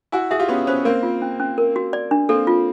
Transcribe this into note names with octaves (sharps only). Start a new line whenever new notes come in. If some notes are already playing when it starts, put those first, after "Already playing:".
E4 F#4 G#5
F#4 G#4 E5
F4 G4
B3 C#4 C6
B3 C#4 C5
A#3 C4 A#4
F4
C#4
C#4
A#4
F#4
D5
D4
A#3 C4 A4
F4